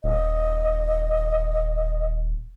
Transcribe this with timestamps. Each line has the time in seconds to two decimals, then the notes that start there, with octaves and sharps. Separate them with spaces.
0.04 D#1 D#5